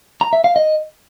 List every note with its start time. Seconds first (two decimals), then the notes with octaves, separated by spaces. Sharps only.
0.21 A#5
0.33 E5
0.44 F5
0.56 D#5